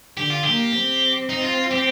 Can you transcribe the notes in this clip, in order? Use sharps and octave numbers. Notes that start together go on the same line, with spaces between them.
D3 G4
F4
G4
A#3
C4
D#4
F4
G4